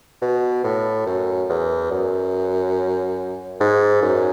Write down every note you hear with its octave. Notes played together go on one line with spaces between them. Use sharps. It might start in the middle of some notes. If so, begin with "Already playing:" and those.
B2
A2
F#2
E2
F#2
G#2
F#2